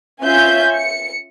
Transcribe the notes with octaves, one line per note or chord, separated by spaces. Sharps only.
C#4 F4 E5 G#5 G6
C#7